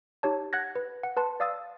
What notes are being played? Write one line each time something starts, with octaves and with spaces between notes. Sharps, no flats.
D#4 G4 C#5 A5
F#5 F#6 G#6 A#6
B4
F#5
B4 A5 C6
D5 F5 D#6 E6 A6